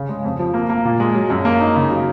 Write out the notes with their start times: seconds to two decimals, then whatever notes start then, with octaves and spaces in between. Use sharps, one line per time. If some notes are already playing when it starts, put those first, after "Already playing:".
Already playing: C#3
0.09 G#3
0.24 F2
0.39 F3
0.54 A#3
0.69 A#3
0.85 A#2
1.00 G#3
1.15 F#3
1.30 F#2
1.45 A#3
1.60 D#4
1.76 C#3
1.91 F#3